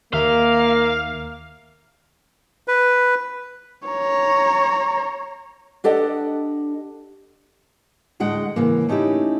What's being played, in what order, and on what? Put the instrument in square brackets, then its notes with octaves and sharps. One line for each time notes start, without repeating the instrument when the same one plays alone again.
[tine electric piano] D#2 E5 [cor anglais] A#3 [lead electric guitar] F5
[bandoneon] B4
[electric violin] C#5 A#5
[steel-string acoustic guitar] D4 G4 A4 D#5 F#5
D2 A2 G#3 F#5 G5
C#3 E3 A#3
A3 C#4 D#4 E4 G4